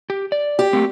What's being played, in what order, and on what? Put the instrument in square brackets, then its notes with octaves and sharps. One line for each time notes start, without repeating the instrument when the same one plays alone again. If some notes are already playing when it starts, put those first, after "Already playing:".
[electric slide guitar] G4
D5
[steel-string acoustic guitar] G4
[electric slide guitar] A3 A#3 C4